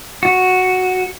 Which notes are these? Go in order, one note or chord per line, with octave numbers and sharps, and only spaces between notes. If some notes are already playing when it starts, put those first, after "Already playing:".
F#4